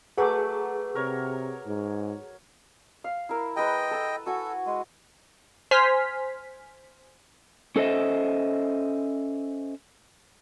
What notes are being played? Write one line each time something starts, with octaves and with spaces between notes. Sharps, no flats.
F#3 A3 G#4 B4 F#5 D6
C3 A#4 C#5
G#2
F5
E4 A#4
G#3 B4 D#5 G5
A4 E6
F#4 A4 G#5
G#3
C5 G#5 C6 F6 B6
C#4 A4 C5 D#5 E5